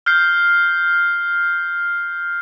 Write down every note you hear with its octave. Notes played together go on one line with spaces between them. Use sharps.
F6 G6 C7